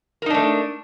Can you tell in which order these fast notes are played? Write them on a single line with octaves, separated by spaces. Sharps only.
A#4 D#4 D4 A3